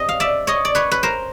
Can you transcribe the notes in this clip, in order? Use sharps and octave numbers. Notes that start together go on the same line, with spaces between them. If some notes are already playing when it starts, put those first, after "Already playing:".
Already playing: G2 C4 D#5
F5
D5 E5
C#5 D#5
D5
B4 C#5
B4
A#4 C5